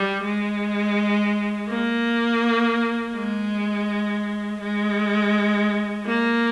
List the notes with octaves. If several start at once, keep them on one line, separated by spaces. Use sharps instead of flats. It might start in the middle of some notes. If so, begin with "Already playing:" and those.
Already playing: G3
G#3
A#3
G#3
G#3
A#3